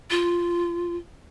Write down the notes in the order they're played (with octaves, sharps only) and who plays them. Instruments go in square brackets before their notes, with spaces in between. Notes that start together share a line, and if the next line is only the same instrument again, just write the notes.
[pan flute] F4